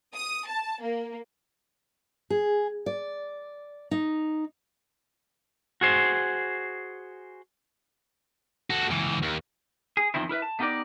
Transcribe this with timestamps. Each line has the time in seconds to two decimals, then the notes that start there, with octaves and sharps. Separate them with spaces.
0.15 D#6
0.47 A5
0.81 A#3
2.30 G#4
2.86 D5
3.91 D#4
5.81 F#4 G#4 C5
8.70 F#4 A4
8.90 C#2 E3
9.22 D#2
9.97 G#4
10.14 E2 D#3 F3 C4 E4
10.29 E4 A#4 B4 E5
10.42 A5
10.59 A3 B3 D#4 G4 A#4 D5